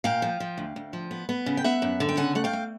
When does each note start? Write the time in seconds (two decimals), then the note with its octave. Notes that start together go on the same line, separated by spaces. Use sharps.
0.04 A#2 F5 G5
0.22 F3
0.40 F3
0.58 D2
0.76 D2
0.93 F3
1.11 B3
1.29 B3
1.46 C#3
1.57 G5
1.64 B3 E5 F#5
1.82 F#2
2.00 D3
2.09 G5
2.17 C#3 F#5 G#5
2.35 A3 F#5
2.44 F5 G5
2.53 A3